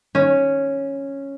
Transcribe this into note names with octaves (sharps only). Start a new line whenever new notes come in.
C#4